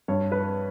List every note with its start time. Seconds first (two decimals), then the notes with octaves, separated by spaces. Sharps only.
0.08 G2 C#5
0.32 B4